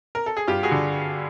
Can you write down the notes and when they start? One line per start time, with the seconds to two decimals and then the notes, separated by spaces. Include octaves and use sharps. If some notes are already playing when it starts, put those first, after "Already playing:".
0.15 A#4
0.26 A4
0.37 G#4
0.48 G2 F4 G4
0.63 F#4 G#4
0.71 D3